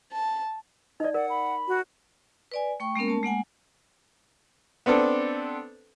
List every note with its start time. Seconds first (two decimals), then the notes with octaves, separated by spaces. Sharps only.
0.12 A5
1.00 D#4 D5 D#5
1.14 A#4 D5 F#5
1.30 B5
1.68 F#4
2.52 B4 D5 G#5
2.80 A3 G5 C#6
2.96 G#3 A#3 B3 C#4 A#4
3.08 A3 A5
3.23 G#3 A#3 F#5 G#5
4.86 B3 C4 D4 A4